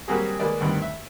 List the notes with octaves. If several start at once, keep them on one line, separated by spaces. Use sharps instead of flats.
F#3 G3 A#3 C4 F#4 G#4
G#3 A#3 B4 D5
D2 G2 D#3 C4
E5